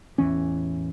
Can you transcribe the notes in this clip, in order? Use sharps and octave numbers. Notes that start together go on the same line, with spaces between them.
A1 E2 E3 C#4